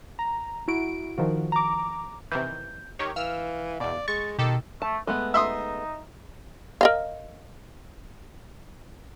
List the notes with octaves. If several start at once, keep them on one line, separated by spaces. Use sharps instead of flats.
A#5
E4 F#4 D7
D#3 F3 F#4
A#5 D6
C3 D#3 E3 G6
D#3 G4 C#5
E3 F5 E6 F6
E2 B2 D5
G#3 C#6 A6
B2 D#3 G4 A4
A3 A5
G#3 A3 B3 B4
D#4 E5 C6 D#6
A#4 D#5 F5